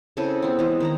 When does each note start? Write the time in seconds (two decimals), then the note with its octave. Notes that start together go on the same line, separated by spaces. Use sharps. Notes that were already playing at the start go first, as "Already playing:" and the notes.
0.17 C#3 C4 E4 A4
0.42 B3 C4
0.59 E3 G#3
0.80 D#3 E4 A#5